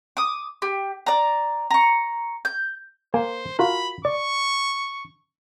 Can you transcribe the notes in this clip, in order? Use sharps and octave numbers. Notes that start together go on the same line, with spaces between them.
D6 D#6
G4
D5 A#5
A#5 C#6
G6
A#3 C5 G#5
F4 F#4 A#4 B5
D5 C#6